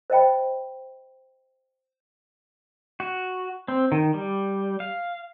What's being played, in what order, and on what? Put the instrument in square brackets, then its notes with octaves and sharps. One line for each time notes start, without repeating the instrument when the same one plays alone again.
[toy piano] C5 D#5 G5 B5
[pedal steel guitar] F#4
C4
D#3
G3
F5